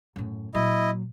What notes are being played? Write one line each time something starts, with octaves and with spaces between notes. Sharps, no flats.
F#2 A2
A#2 F#3 E4 D#5